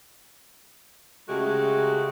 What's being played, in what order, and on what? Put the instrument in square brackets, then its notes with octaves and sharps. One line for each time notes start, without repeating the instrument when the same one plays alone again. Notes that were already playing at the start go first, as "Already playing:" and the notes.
[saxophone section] C#3 G#3 A3 F#4 G4 A4